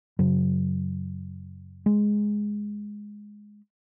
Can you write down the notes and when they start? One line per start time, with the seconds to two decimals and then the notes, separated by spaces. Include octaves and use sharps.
0.19 F#2 C#3 F#3
1.86 G#3